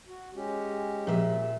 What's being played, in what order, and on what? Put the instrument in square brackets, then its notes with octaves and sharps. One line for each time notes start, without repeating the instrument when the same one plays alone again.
[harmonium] F#4
G#3 C#4 G4
[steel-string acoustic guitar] A#2 E5 [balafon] F3 G#4